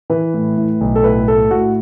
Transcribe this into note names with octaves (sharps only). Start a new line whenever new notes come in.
E3 B4
A2
A2
B1
A4
A2 B4
A2 A4
A2 F#4